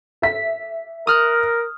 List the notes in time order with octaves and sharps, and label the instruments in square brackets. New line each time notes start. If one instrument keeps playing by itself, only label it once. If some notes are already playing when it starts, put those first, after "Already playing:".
[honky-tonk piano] E5 B6
[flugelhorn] A#4 [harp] D#6 F6 F#6